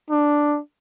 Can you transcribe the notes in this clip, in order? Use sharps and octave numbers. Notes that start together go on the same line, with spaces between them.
D4